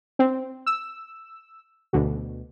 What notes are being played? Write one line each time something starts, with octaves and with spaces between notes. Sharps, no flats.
C4
E6
D2 B2